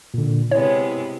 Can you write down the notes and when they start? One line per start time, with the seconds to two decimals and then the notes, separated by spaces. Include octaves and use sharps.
0.14 A#2 D3
0.51 C3 G#3 B3 E4 C#5